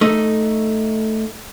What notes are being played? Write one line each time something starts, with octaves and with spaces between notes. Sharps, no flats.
A3 D#4